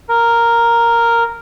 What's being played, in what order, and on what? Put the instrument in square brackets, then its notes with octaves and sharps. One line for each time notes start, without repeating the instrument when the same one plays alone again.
[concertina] A#4